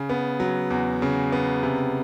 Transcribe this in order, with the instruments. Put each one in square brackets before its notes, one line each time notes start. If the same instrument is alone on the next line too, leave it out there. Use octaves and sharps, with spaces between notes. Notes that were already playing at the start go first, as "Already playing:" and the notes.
Already playing: [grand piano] C#3
B3
F#3
E2
C#3
B3
C3